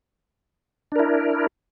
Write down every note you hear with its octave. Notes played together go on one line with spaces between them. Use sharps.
D4 E4 A#4